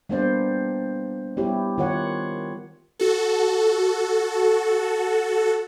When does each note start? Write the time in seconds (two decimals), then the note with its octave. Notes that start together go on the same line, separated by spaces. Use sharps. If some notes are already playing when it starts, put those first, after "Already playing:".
0.09 G3 A#3 B3 D4 C5 D5
1.37 G3 B3 E4 G4 C#5
1.78 D#3 F4 C#5 F#5
2.99 F#4 A4